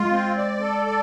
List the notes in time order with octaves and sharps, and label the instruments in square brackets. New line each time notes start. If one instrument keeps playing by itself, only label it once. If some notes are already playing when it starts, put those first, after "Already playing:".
Already playing: [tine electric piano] G#3 [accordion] F4
[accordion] C4
D5
A4
D5